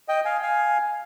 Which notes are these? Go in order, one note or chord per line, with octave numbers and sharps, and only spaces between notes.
D#5 G5
F5 G#5
F5 G#5